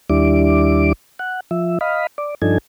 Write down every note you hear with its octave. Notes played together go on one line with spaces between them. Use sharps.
D#2 G3 D4 E4 D6
F#5
F3 E5
D#5 F5 B5
D5
G2 F3 D4 D#4 A4 G#5